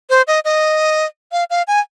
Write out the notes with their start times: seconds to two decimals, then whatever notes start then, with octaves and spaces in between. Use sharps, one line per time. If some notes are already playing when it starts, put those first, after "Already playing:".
0.10 C5
0.27 D#5
0.45 D#5
1.32 F5
1.50 F5
1.68 G#5